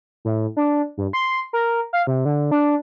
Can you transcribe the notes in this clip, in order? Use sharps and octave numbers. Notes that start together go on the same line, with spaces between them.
A2
D4
G2
C6
A#4
F5
C3
D3
D4